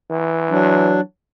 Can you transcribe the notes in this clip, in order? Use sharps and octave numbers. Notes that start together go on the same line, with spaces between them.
E3
F#3 D4